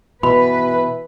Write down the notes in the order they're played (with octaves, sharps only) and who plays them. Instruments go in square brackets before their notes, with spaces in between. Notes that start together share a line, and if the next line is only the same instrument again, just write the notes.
[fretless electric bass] B2 [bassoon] E3 [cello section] B4 [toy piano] B5